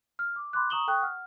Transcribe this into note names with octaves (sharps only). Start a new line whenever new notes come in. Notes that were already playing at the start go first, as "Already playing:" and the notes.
F6
D6
B5 C6 D6 F#6
A#5 C#6 D#6 E7 F#7 G7
A4 G5 C#6 D#6 F#6
F#5 F6